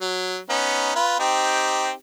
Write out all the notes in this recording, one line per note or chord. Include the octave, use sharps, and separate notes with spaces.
F#3
B3 C#4 D#4
F4 B4
C4 D#4 G4